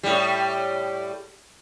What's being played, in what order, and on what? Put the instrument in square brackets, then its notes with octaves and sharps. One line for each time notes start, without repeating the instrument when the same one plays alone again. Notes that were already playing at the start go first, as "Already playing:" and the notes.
[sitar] A2 G3